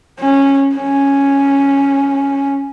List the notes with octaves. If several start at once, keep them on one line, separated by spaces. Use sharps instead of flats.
C#4
C#4